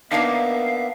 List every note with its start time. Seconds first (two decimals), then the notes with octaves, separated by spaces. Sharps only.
0.11 A#3 B3 D4 D#4 E5 F5